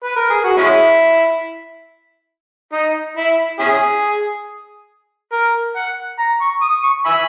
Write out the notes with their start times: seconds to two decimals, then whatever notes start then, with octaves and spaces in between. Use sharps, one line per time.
0.04 B4
0.16 A#4
0.30 G#4
0.45 F#4
0.58 G#3 C#4 E4
2.73 D#4
3.17 E4
3.60 C#4 E4 G#4
5.32 A#4
5.76 F#5
6.19 A#5
6.41 C#6
6.62 D#6
6.84 C#6
7.06 E5 G#5 B5